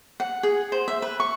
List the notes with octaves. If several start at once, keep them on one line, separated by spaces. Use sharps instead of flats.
F#5
G#4
C5
E5
B4
C#6